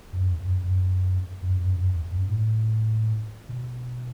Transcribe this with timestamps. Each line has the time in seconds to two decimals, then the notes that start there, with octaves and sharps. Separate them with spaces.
0.13 F#2
0.31 E2
0.39 F#2
0.64 F#2
1.42 F#2
1.60 F#2
1.77 F#2
1.94 E2
2.11 F#2
2.20 G2
2.28 A2
3.49 B2